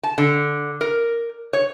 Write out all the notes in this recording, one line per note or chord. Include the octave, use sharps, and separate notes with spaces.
A5
D3
A#4
C#5